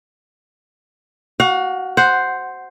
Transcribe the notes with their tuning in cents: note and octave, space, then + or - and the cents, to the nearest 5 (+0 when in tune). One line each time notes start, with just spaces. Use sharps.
F#4 +15 F5 +40
C5 +0 F#5 +0